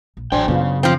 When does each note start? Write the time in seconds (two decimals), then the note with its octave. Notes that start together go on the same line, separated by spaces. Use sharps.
0.17 A#1
0.32 A1 F#3 D4 C5 G5 G#5
0.48 F#2 C#3 B3 F4
0.83 F3 C4